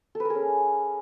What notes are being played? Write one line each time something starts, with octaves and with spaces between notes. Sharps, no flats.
A4
B4
A#4
G#4
C#4